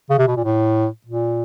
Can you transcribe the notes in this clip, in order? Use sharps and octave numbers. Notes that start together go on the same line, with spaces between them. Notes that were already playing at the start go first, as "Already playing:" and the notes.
C#3
C3
B2
A#2
A2
A#2